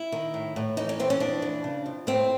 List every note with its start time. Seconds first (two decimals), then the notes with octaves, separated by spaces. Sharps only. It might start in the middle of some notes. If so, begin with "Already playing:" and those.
Already playing: E4
0.12 D#3
0.34 A2
0.56 A2
0.77 E3 D#4
0.89 C#4
0.99 E3 C4
1.10 C#4
1.20 F2 D4
1.42 E3
1.64 C#3
1.86 F2
2.07 A2 C4